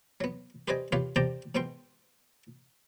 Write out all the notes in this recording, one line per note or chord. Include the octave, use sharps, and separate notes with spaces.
F#3 B3
G4 B4 C5 D5 D#5 G#5
F4 G4 B4 C#5 F5
G4 C5 D5 G5 A5 A#5
G#2 B2 B3 G5 C6